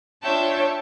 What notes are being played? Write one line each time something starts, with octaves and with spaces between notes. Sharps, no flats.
D4 F4 C#5 E5 G5 A5